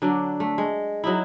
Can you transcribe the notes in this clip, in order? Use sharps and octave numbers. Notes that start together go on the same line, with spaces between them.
D3 F#3 D4
A3
G#3
F#3 D#4 E4